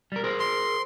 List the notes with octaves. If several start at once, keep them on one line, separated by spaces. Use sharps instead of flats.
G3 A#4
G#4 A#4 C5
C6